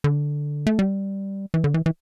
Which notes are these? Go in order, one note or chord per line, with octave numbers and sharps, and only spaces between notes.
D3
A3
G3
E3
D3
E3
E3